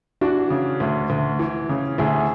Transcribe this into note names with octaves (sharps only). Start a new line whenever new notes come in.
E3 D4 F#4
C#3
D2
D2
E3
C#3
D2 E4 G#4